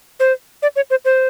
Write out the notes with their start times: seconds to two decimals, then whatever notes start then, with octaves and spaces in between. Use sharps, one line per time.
0.20 C5
0.62 D5
0.76 C#5
0.90 C5
1.05 C5